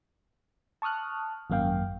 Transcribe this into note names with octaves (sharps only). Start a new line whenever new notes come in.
A5 C#6 D#6 F6 F#6
G#1 F#2 A#3 F5 G5